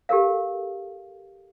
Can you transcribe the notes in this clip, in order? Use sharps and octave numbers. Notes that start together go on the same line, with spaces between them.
G4 A4 A#4 F5